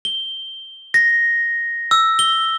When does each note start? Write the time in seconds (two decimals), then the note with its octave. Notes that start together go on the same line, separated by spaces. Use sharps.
0.05 G7
0.94 A#6
1.91 E6
2.19 G7